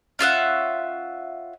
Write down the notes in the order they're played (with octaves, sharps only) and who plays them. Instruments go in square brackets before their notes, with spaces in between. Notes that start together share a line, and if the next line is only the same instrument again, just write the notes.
[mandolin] C#4 F4 E5 F#5